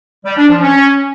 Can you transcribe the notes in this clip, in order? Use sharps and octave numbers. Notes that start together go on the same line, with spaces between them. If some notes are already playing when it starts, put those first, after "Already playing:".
G3
D4
F3
C#4